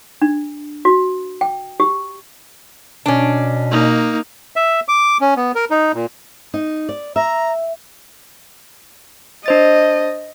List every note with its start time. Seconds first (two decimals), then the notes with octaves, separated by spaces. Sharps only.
0.22 D4
0.85 F#4
1.41 G5
1.80 G4
3.06 B2 C#4 D4
3.71 A#3 D#4
4.56 E5
4.88 D6
5.21 C#4
5.36 B3
5.55 A#4
5.70 D#4
5.94 A#2
6.54 D#4
6.89 D5
7.16 E5 A#5
9.46 D4 C5 D#5 A6